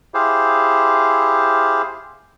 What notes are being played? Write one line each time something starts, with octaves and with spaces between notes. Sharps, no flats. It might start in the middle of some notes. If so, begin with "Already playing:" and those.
E4 G4 G#4 C5 F5